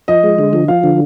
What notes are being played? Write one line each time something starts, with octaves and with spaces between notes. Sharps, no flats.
F3 D#5
G#3
D3
F3
F3 F5
D3